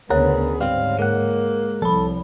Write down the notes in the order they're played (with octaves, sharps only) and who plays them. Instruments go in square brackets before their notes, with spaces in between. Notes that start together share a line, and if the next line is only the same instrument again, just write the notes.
[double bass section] D2 C#3 B3 [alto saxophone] G#4 [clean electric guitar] A#4 F#5 [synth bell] C#5
[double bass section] G#2 [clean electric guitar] G3 C4 [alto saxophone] F5
[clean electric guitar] G#3 F#5 [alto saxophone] A#3
[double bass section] C2 [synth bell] F3 B5 [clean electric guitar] A4